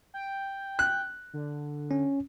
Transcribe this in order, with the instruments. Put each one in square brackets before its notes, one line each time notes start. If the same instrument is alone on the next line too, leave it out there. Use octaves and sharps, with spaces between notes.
[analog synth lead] G5
[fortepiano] F#6
[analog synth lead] D3
[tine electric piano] C#4